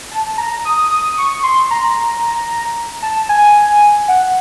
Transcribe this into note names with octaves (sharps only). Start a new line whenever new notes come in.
A5
A#5
D#6
D#6
C#6
C6
A#5
A5
G#5
F#5